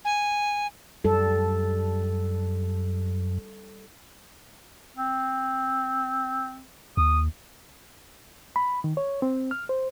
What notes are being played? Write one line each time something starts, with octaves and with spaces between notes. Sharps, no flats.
G#5
F#2 G3 A4
C4
D#2 D#6
B5
D#3
C#5
C4
F6
C5